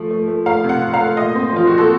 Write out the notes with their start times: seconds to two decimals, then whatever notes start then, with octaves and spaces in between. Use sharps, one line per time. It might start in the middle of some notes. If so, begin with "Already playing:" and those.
Already playing: F3 A3
0.10 A3
0.28 A3
0.46 A3 F5
0.64 C3
0.69 F#5
0.81 C3
0.94 F5
1.00 A3
1.17 A#2 D#5
1.35 C4
1.53 F3 F4
1.67 A#2 F#4
1.78 A4